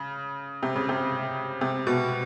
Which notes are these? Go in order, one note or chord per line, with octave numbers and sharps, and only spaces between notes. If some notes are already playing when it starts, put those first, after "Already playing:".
Already playing: C#3
C3
C#3
C3
C3
B2